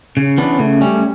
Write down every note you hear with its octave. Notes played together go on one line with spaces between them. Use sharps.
C#3 C#4
E3 B3 D4
C#3 A3
G3 C#4